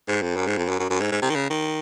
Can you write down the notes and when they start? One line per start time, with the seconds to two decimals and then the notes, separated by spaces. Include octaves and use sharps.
0.08 G#2
0.22 F2
0.36 F#2
0.47 G#2
0.57 F2
0.68 F#2
0.80 F#2
0.90 F#2
1.00 G#2
1.12 G#2
1.22 C3
1.30 D#3
1.35 C#3
1.50 D#3